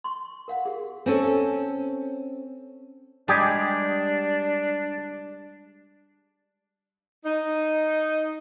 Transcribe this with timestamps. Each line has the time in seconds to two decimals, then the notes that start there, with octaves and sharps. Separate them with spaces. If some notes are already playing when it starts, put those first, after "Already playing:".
0.04 C6 C#6
0.48 A#4 F5 F#5
0.65 G4 G#4
1.06 C4 C#4 A4
3.28 G3 G#3 D4 G4 G#4
7.24 D#4